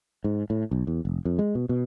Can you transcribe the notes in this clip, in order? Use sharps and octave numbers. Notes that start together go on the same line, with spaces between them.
G#2
A2
B1
E2
F1
F2
G#3
B2
B2